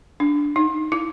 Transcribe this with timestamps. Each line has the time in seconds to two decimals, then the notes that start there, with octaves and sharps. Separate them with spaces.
0.20 D4
0.56 D#4
0.92 E4